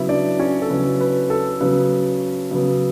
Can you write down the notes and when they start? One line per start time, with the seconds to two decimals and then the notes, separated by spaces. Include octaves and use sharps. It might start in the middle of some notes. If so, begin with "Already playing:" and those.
Already playing: C#3 F#3 B3 E4 E5
0.09 D4 D5
0.39 C#4 C#5
0.62 A4
0.70 C#3 F#3 B3 B4
1.00 B4
1.30 A4
1.60 C#3 F#3 B3 B4
2.51 C#3 F#3 B3